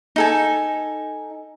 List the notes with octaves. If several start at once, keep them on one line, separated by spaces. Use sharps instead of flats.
D#4 A4 G#5